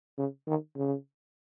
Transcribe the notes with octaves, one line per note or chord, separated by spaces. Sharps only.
C#3
D#3
C#3